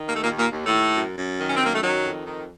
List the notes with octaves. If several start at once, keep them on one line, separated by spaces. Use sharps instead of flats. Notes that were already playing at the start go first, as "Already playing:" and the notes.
Already playing: D#3
D#2 A#3
A3
A#2 A#3
D#2
A#2 A#3
D#2
A2 A3
D#2
F#2
F#2
D#3
C#4
C4
F#2 A#3
A3
D#3 F#3
F2
D#3